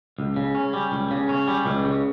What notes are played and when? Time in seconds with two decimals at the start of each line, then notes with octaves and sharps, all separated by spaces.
0.19 C#2
0.36 C#3
0.55 C#4
0.73 G3
0.92 C#2
1.11 C#3
1.29 C#4
1.47 G3
1.66 C#2
1.85 C#3